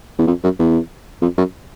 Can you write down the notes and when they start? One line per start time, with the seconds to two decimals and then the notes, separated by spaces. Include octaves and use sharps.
0.19 E2
0.27 F2
0.44 F#2
0.59 E2
1.22 F2
1.38 F#2